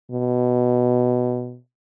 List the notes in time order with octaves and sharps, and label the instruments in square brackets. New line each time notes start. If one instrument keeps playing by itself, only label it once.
[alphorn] B2